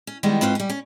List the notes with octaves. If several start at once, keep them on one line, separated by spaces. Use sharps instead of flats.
C#4
D#3 G3 G#3 B3
G#2 C4 F4 B4 C#5
G3 C#4
C#4